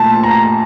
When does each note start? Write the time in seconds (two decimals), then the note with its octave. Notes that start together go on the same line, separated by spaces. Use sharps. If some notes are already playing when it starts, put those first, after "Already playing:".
Already playing: A#2 A3 A5
0.23 A#5